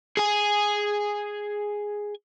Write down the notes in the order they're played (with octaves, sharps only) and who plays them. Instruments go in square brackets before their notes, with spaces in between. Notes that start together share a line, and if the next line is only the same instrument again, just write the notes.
[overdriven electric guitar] G#4 G#5